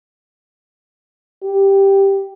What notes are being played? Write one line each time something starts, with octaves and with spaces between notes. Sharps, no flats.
G4